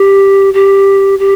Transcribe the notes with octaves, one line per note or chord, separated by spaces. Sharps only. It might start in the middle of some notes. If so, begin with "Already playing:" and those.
Already playing: G4
G4
G4